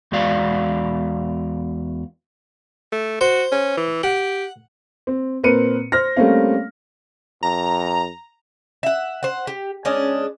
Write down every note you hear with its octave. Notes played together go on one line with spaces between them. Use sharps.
E2 G#3 F#4 D5 F5
A3
F#4 C5
C#4
E3
G4 F#5
C4
A#2 C4 A#4 B4 C#7 D#7
C5 F6 A#6
G3 A3 A#3 C4 C#4 F5
F2 A#5
E5 F#5
C5 F#5
G4
G#3 C#4 D4 D#5